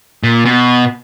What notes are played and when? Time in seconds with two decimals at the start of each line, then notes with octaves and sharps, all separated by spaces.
0.23 A#2
0.45 B2